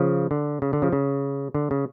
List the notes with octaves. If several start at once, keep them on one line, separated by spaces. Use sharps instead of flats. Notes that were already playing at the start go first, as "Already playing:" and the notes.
Already playing: C#3 F3
D3
C#3
D3
C#3 F3
C#3
D3
C#3